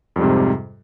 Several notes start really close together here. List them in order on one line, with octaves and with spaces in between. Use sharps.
F2 G3 G#2 C3